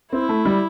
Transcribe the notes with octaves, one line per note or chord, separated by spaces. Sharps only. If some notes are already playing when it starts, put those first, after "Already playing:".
C4 E4
A3
G3